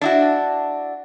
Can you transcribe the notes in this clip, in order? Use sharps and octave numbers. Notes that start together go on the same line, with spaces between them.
D4 E4 F#4